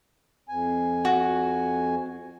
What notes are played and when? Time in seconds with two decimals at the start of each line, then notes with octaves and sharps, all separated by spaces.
0.49 F2 G#5
1.05 F#4